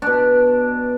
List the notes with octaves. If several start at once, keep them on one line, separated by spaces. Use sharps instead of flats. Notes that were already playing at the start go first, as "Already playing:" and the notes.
B2 D4